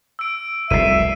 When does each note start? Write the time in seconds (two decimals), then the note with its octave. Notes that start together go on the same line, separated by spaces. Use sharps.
0.19 E6 D7
0.70 F1 C2 E5 C7 D#7